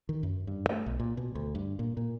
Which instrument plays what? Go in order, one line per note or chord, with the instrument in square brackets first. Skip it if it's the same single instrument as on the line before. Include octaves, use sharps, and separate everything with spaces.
[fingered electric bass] D#3
F#2
G2
A3
B1
A#2
B2
D2
G2
A#2
A#2